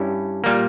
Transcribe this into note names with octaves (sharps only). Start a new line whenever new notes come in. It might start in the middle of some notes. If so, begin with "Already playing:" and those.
Already playing: G2 G3 C#4 E4
A#2 G3 A#3